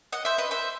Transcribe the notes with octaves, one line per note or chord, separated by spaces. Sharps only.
D#5 F#5
C5 E5
B4 D#5
C5 E5